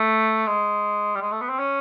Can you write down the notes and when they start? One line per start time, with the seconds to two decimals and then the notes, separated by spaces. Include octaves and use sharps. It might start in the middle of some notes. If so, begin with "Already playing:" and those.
Already playing: A3
0.47 G#3
1.15 G3
1.21 G#3
1.32 A3
1.41 B3
1.50 C4
1.59 C#4